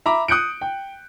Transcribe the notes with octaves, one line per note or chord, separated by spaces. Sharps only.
E5 A#5 B5 D6
D#6 F#6 G6 C#7 D7
G5